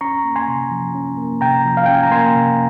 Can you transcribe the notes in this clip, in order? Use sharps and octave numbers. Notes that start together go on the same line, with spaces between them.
C#4 A#5 C#6
A#3
G#5 C6
C3
F3
C#4
A#3
C3 G5 A#5
F3
F5
C#4 G5
G#5
A#5
A#3 G#5 C6
C3